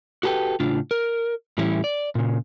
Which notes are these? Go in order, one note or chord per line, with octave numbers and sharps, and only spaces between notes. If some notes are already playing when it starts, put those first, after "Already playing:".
F#4 G4 A4 B4 G5
A2 C#3 D4 F4
A#4
A2 E3 G3 A3 C#4 E4
D5
A#2 C#3